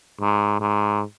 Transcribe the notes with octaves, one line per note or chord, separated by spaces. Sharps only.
G#2
G#2